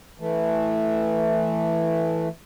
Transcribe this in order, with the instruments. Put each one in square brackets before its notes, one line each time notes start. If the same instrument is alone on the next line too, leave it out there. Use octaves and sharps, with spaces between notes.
[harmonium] E3 A3